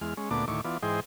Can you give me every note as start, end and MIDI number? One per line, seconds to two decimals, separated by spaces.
0.01 0.14 40
0.01 0.14 56
0.01 0.14 89
0.17 0.29 56
0.17 0.29 61
0.31 0.45 38
0.31 0.45 46
0.31 0.45 57
0.31 0.45 59
0.31 0.45 62
0.31 0.45 86
0.48 0.61 38
0.48 0.61 45
0.48 0.61 51
0.48 0.61 64
0.48 0.61 85
0.48 0.61 86
0.64 0.78 52
0.64 0.78 59
0.64 0.78 65
0.64 0.78 74
0.83 1.00 44
0.83 1.00 52
0.83 1.00 68
0.83 1.00 72
0.83 1.00 75
0.83 1.00 79